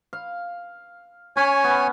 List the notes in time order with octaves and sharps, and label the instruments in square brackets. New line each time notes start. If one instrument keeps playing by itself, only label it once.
[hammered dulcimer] F5
[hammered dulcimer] C#4 [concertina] C#5 G#5
[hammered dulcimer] B3